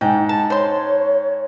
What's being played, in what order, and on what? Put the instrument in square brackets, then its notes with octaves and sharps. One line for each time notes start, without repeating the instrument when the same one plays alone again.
[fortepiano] G#2 [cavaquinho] G5
[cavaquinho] A5
[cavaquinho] C5 C6 [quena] C#5